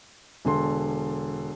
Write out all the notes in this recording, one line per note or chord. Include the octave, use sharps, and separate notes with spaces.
E1 D3 C6